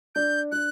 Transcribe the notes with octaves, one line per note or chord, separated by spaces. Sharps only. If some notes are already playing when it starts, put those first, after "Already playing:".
D4 G6
D4 F#6